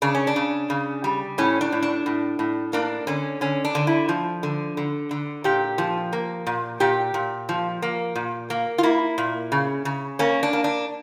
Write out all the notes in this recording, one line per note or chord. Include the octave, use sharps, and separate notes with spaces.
C#3 D4
C#4
D4
C#3
C#3
G3
A2 C#4
D4
A2
D4
A2
A2
A#3 D4
D3 C#4
D3 C#4
D4
D3
E4
F3
D3
D3
D3
A#2 G4
F3
A#3
A#2
A#2 G4
A#2
F3
A#3
A#2
A#3
F4
A#3 E4
A#2
C#3
C#3
A#3 C#4
D4
A#3
D4